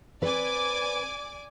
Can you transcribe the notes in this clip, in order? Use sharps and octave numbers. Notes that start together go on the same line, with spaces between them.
C4 B4 D5 G#5 D6